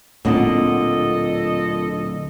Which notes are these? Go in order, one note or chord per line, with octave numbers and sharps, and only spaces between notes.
D1 A#2 C4 D4 A4 D#5 F#5